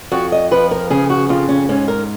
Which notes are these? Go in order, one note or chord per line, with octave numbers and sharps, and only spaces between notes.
F2 F#4
D#5
F3 B4
A#4
C#3 G#4
F#4
F2 F4
C#4
G#2 C#4
A#4